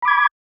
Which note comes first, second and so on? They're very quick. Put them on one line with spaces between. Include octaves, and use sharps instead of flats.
B5 D6 G#6